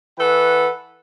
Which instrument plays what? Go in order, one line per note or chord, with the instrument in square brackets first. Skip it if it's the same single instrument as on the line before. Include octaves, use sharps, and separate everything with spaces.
[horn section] E3 A4 B4 F#5